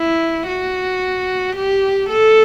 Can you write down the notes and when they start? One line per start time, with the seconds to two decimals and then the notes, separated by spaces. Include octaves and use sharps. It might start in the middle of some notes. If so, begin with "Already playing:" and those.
Already playing: E4
0.47 F#4
1.56 G4
2.09 A4